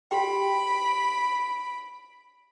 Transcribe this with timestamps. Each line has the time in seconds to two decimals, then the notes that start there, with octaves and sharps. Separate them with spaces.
0.11 F#4 G4 G5 B5 D7